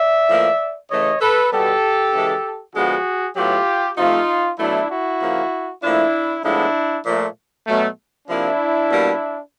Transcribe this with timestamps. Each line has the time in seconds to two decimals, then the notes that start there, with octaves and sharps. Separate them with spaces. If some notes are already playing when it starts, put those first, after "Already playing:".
Already playing: D5 E5
0.28 A2 F3 A#3
0.89 C#3 E3 A3 C#5 D#5
1.20 A4 B4
1.50 B2 G3 B3 G4 A4
2.13 C#3 E3 G#3
2.74 D3 F3 G#3 B3 F#4 G#4
3.36 A2 F#3 B3 F4 G4
3.97 C3 F3 A3 D#4 F4
4.58 B2 F#3 A3 D4 E4
4.89 E4 F#4
5.21 C#3 F3 A#3
5.81 A#2 F3 A3 D4 E4
6.44 A2 F3 G#3 B3 D4 E4
7.05 A#2 F3 A3
7.67 B2 F#3 A3
8.28 C3 F3 A#3 D4 E4
8.90 B2 G3 A#3